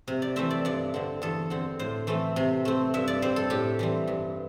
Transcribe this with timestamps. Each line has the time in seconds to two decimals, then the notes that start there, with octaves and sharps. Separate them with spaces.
0.08 C3
0.22 D5
0.36 E3 A3 C4 E5
0.50 D5
0.65 G2 D5
0.94 D3 C4
1.22 E2 A4
1.50 D3 C4
1.79 A2 C5
2.07 E3 A3 C4
2.36 C3
2.65 A3 C4
2.94 G2 E5
3.08 D5
3.22 G3 C4 C5
3.36 A4
3.50 A2 G4
3.79 E3 G3 C4
4.07 G2